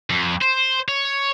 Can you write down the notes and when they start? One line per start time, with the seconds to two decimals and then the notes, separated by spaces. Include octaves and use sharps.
0.10 F2
0.42 C5
0.88 C#5